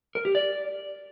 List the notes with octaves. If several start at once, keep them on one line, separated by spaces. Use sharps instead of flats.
A#4
G4
D5